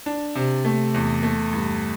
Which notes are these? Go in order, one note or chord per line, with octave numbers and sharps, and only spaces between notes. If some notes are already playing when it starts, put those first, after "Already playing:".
D4
C3
A3
E2
A3
G2